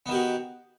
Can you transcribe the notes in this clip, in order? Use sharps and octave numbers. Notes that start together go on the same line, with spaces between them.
D#3 B3 F#4 G4